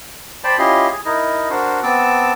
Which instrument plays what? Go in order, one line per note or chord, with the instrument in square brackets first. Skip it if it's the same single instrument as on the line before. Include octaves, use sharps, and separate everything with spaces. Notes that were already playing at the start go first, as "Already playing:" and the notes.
[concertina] C5 D5 G5 A5 B5
C#4 E4 F4 G4 D#5 C6
G#4
D#4 E4 A#4 D#5
D4 F#4 A#4 C5
B3 C4 A5 D6 E6